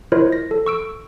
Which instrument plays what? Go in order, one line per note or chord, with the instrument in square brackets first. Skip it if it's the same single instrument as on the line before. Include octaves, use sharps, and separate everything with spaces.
[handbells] E4 F4 A#4 C5 C#5 D#5
A#6
A4
C#6 E6 D7